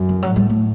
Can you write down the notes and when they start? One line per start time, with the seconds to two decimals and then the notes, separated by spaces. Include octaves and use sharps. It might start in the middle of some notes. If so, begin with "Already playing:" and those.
Already playing: F#2
0.09 E3
0.22 F#3
0.28 A2
0.36 G3
0.50 A3